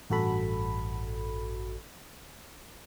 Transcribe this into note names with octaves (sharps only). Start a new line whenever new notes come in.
A1 G2 F#4 A4 B5